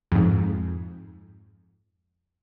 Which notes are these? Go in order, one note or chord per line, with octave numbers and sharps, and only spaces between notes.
F2 G#2